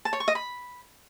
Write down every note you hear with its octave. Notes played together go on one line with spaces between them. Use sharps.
A5
C#5
C#6
D#5
B5